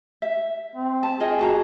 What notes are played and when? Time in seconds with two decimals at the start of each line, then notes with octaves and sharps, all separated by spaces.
0.22 E5
0.76 C4
1.03 A5
1.20 F4 G#4 D#5 G5
1.39 F#4 A5 A#5